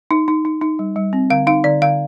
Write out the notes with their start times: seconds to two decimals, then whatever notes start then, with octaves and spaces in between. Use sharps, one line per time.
0.11 D#4
0.28 D#4
0.45 D#4
0.61 D#4
0.79 G3
0.96 G3
1.13 C4
1.30 D3 F5
1.47 D#4 F5
1.64 D3 D5
1.82 D3 F5